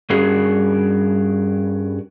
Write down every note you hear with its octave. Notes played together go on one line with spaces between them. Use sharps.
G2 C#4 F#4 G#4 A#4